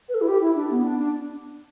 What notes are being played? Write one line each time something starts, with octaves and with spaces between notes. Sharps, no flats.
B4
A4
E4
G4
E4
D4
B3
D4
D4